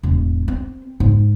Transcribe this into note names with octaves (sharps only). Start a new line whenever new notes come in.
E1 A2
C4
G#2